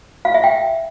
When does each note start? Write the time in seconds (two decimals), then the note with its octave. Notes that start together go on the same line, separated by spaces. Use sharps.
0.25 F5
0.34 E5
0.44 G5